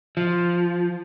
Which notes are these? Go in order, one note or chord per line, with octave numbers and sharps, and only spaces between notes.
F3